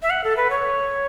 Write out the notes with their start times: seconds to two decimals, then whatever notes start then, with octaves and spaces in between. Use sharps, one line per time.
0.02 E5
0.10 F#5
0.24 A4
0.37 B4
0.50 C#5